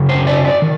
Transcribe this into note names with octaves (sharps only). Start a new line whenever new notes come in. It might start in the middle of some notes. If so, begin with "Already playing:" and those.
Already playing: F#2 C#3
C5
D5
D5
D#3